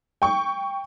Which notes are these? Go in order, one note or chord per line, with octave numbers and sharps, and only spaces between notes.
G5 C#6